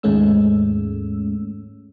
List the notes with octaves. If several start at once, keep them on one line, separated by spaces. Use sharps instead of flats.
D#2 G#2 G#3 A3 C#4 E6